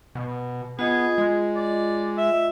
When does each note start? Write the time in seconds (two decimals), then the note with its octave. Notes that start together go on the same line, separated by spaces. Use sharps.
0.15 B2
0.79 B3 F4 G#4 D#5
1.18 G#3
1.56 D5
2.18 E5